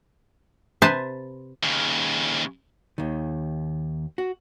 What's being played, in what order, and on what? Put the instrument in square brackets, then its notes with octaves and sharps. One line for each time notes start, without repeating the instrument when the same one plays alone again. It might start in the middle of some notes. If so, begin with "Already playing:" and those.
[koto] C3 B4 C5 G#5 A5
[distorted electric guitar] D#2 C#3
[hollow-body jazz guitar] D#2 D#3
F#4